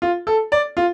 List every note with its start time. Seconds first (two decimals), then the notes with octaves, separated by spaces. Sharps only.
0.02 F4
0.27 A4
0.52 D5
0.77 F4